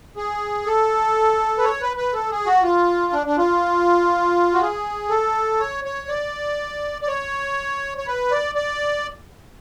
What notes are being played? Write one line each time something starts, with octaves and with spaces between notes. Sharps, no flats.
G#4
A4
B4
C#5
B4
B4
A4
G#4
F#4
F4
D4
D4
F4
F#4
G#4
A4
C#5
C#5
D5
D5
C#5
C#5
B4
D5
D5